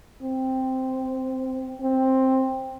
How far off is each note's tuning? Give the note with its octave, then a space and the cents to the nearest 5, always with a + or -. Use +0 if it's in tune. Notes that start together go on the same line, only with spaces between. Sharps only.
C4 -5
C4 +10